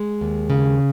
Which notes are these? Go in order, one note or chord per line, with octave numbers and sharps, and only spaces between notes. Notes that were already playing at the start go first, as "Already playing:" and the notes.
Already playing: G#3
D#2
C#3